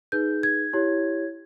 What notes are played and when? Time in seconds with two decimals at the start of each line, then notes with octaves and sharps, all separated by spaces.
0.12 D#4 G#4 B4 G6
0.43 G#6
0.73 E4 G4 C#5